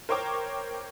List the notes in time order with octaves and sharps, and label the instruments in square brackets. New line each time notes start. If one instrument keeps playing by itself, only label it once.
[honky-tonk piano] A#4 C5 C#5 G5 C#6 D6